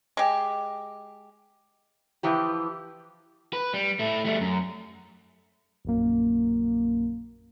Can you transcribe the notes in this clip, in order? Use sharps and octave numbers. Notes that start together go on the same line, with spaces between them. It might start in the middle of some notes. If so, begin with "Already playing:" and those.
G#3 G4
E3 F3 G4
B4
G3
A3 E4
G3 A3
F#2
A#1 F#2 A#3